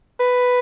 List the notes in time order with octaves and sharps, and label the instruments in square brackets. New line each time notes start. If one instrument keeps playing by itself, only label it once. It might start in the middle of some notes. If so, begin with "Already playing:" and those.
[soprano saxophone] B4